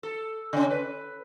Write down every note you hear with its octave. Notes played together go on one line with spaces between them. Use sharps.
A4
C#3 C#4
B4